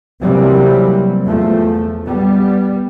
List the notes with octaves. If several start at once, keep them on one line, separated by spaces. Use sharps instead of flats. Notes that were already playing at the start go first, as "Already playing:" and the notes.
C3 E3 F#3 G3 A#3 C4
E2 F3 A3
G3 B3